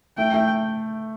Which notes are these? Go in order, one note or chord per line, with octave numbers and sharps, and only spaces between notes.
A3 G5
A3